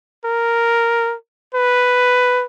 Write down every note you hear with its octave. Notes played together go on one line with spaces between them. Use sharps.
A#4
B4